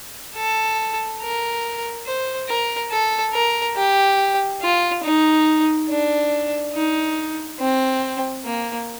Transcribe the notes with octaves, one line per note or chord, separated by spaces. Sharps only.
A4
A#4
C5
A#4
A4
A#4
G4
F4
D#4
D4
D#4
C4
A#3